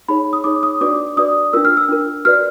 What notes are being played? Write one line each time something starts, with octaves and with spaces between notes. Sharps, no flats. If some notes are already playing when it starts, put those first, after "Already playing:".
D#4 G#4 C#5 B5
D#6
D#4 G#4 C#5 D6
D#6
D4 F#4 B4 D5 D6
D4 F#4 B4 D5 D#6
D4 F4 A#4 E6
F6
E6
D4 F4 A#4
F#4 B4 D5 F6